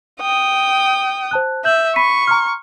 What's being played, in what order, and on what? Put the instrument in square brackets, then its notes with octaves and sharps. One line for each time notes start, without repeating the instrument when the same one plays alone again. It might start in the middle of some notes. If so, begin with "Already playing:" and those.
[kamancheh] G5 D#6
[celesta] C5 A5 F#6
[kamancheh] E5 [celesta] G6 F#7
[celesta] B5 B6 D#7 [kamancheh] C#6
[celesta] A#5 C6 F6